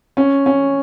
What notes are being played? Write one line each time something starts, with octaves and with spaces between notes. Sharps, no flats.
C#4
C#4